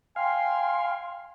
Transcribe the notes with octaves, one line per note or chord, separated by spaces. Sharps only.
F5 G5 G#5 C6